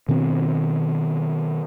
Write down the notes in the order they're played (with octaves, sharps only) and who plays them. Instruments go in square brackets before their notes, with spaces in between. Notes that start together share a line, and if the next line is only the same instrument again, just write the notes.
[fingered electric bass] B2 D#3 B3 C4